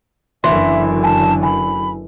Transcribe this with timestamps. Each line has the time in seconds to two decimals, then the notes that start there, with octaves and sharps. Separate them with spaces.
0.44 F#1 F#2 D3 E3 E5 C6
1.04 G#5 A5
1.43 G#5 B5